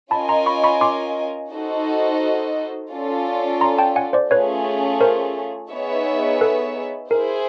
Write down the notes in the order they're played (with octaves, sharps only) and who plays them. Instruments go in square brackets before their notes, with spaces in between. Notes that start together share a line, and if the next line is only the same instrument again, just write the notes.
[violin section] C#4 F4 A#4 D#5 G#5 [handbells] A5 B5
[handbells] A#5 C6
B5 C#6
B5 C#6
C6 D6
[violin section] D#4 F#4 A4 C5 D#5
C#4 F4 A4 D5
[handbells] A#5 C6
G5 A5
F#5 G#5
C5 D5
[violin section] A3 C#4 F4 G#4 [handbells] B4 C#5
[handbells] A#4 C5
[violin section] B3 D#4 G#4 C#5 E5
[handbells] A4 B4
[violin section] E4 G#4 C5 [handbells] A#4